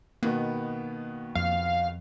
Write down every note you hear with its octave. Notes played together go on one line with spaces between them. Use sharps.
B2 D#3 A#3 B3
F2 F5